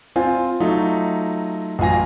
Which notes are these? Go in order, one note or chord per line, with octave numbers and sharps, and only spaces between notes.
C4 F4 C5 G#5
F#3 A3 D#4 F4
A1 F#3 F4 G#5 A#6